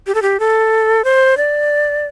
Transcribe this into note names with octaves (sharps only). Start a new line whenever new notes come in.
G4
A4
G4
A4
C5
D5